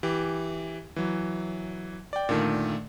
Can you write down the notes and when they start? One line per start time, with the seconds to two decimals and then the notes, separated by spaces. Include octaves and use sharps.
0.03 E3 G4
0.96 E3 F#3
2.13 D5 G5
2.29 A#2 D3 D#3 A3